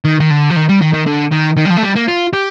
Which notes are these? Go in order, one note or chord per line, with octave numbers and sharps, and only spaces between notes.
D#3
D#3
D3
F3
D#3
G3
D#3
D#3
D3
D#3
D#3
G3
F3
A3
G3
A#3
F4
G4